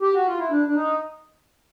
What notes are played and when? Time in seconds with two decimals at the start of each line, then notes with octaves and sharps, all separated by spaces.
0.02 G4
0.14 F#4
0.26 F4
0.38 E4
0.50 D4
0.66 D4
0.75 D#4